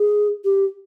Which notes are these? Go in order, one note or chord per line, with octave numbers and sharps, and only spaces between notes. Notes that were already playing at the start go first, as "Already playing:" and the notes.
Already playing: G#4
G4